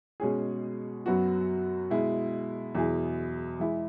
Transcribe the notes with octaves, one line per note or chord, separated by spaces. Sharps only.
B2 G#3 C#4 G#4
F#2 F#3 B3 F#4
B2 G#3 E4
E2 B2 F#3 E4 G#4
E3 G#3 E4 G#4